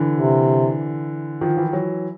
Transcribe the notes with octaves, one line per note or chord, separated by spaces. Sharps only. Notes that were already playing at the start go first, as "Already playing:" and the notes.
Already playing: D3 E3
C3
D#3 F3
E3
F3
E3 F#3